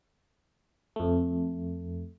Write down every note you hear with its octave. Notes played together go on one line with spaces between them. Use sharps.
F2 A3